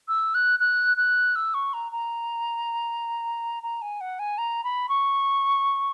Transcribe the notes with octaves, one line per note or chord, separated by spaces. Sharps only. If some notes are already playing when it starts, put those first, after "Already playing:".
E6
F#6
F#6
F#6
E6
C#6
A#5
A#5
A#5
G#5
F#5
G#5
A#5
B5
C#6